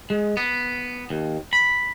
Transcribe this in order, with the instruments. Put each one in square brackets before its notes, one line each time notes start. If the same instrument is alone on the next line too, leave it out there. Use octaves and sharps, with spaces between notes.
[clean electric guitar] G#3
B3
D#2
B5